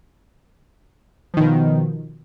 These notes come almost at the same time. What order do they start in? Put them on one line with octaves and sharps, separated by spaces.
F3 D#3 B2